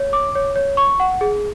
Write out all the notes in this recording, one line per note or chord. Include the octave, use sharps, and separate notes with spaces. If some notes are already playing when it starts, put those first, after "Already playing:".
Already playing: C#5
D6
C#5
C#5
C#6
F#5
G#4